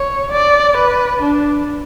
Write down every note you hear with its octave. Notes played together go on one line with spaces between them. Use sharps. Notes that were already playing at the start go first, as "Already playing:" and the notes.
Already playing: C#5
D5
B4
D4